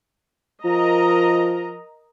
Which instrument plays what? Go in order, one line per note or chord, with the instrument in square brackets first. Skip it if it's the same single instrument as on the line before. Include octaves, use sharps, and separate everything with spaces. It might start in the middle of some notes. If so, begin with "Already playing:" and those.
[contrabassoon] F3 [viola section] A#4 D#5 A#5